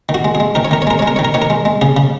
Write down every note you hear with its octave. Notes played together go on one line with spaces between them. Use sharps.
D#3
F#4
G#3
G#4
G#3
D#3 A#4
C#5
D#3 A#4
C#5
G#3 A#4
G#3 C#5
A#4
D#3 C#5
A#4
D#3 C#5
A#4
G#3
G#3
C#3 G#4
C#3